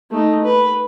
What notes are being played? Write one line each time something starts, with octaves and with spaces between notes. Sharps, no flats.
A3 D#4
B4